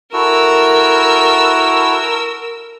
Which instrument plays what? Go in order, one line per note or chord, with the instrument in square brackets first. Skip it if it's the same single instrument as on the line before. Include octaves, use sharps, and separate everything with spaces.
[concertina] E4 F#4 A4 [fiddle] A#4 E6